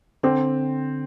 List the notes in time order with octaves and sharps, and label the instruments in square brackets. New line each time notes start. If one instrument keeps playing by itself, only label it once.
[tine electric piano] D3 [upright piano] C4